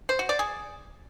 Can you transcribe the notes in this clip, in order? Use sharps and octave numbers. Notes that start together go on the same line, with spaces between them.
C5
F#4
D5
G#4